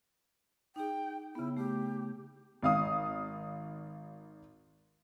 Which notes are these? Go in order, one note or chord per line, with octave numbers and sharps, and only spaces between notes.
D#4 G#4 G5
C#3 B3 E4
A3 G4
G#1 F5 D#6